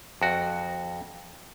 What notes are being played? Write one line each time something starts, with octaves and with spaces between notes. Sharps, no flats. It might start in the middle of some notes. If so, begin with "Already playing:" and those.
F2 F#4